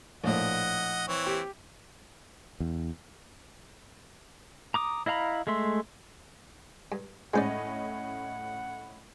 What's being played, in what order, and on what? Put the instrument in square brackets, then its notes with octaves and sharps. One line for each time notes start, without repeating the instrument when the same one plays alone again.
[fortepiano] A#1 A2 [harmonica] D#5 F#5
[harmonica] E3 C4 C#5
[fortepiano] G4
[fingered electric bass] E2
[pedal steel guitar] A#5 D6 D#6
E4 D#5 F5 A#5 B5
G#3 A3 E5 C6
[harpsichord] G2
[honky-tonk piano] A2 C#4 D#5 [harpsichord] G#3 C5 D5 [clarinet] F#5